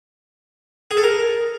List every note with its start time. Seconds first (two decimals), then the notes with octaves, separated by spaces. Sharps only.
0.91 G#4
0.97 A4
1.03 A#4